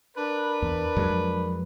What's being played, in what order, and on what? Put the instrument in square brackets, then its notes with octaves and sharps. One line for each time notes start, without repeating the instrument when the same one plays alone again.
[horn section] D4 A#4 B4
[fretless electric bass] E2
F2 F#3 G#3